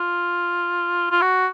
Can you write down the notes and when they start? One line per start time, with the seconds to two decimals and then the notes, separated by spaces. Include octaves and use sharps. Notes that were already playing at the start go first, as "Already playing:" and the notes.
Already playing: F4
1.11 F4
1.22 F#4